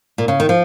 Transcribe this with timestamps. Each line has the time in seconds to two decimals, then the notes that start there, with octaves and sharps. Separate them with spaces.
0.18 A#2
0.28 C#3
0.40 D#3
0.49 F3